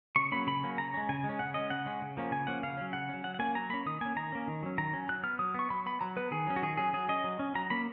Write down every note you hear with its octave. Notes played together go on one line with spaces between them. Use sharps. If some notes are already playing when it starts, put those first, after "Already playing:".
C#3 C#6
F#3 A#3 C#4 B5
C#3 B5
F#3 A#3 C#4
C#3 A#5
G#3 C#4
C#3 G#5
G#3
C#4
C#3 F#5
G#3 C#4 D#5
C#3 F#5
G#3 C#4
C#3
F3 A#3 C#4
C#3 G#5
F3 A#3 C#4 F#5
C#3 F5
F#3 C#4
C#3 F#5
F#3 C#4
F#3 F#5
F#5
A#3 C#4 G#5
F#3 A#5
A#3 C#4 B5
D#3 D#6
A#3 C#4 G#5
D#3 A#5
A#3 C#4
D#3
F#3 C#4
D#3 A#5
F#3 C#4
F#3 F#6
B3 F6
F#3 D#6
B3 C#6
F#3 B5
B3 B5
F#3 A#5
B3 B4
D#3 G#4
F#3 C#4
F#4
D#3 G#4
F#3 C#4 G#4
F#3 G#4
C#4 D#5
F#3
C#4
F#3 A#5
A#3 C#4 B5